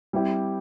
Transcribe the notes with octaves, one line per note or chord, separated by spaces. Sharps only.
G3 C4 E4 G4